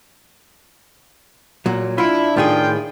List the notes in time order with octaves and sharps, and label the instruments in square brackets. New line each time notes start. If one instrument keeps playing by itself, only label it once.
[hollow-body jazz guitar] A#2 F#3
[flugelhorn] D4 [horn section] E4 [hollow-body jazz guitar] F4
[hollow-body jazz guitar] A2 D#3 G#4 [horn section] F4 G5